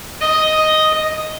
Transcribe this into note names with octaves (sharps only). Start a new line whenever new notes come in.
D#5